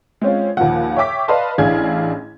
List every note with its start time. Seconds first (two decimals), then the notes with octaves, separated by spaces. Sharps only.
0.22 G#3 C4 C#4 F4
0.57 D#2 A#2 F3 F#5
0.96 C#5 E5 G5 D6 B6
1.28 B4 D5 D#5 F5 A5 C6
1.58 A1 D4 E4 G#4 F5 G#6